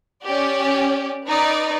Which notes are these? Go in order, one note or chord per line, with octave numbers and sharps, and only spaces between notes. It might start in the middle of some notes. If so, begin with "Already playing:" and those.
C#4 G4 D5
D#4 B4 D5